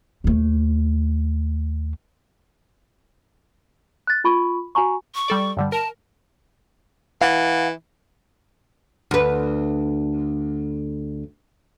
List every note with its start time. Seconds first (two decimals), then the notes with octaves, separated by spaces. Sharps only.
0.24 D#2 A3
4.07 F#6 A6
4.24 F4 B5 C#6
4.75 F#4 G#5 A#5 C#6
5.15 C#6
5.28 G3 A4 D5
5.57 G2 D3 G3
5.72 A#4 A5
7.22 E3 F5 F#5
9.11 D2 B4